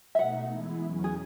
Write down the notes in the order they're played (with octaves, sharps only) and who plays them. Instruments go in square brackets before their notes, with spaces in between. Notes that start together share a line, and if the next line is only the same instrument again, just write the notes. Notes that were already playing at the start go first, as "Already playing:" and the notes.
[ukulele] E5
[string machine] B2 A3 D#4 [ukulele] F#5
[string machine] E3 G#3 B3 E4
E2 B2 F#3 C#4
[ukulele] G#4